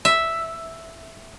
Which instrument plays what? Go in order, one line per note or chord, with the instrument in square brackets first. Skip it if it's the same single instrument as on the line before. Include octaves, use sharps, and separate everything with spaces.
[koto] E5